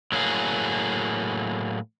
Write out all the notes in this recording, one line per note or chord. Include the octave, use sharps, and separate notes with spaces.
A2 F#3 A#3 G#4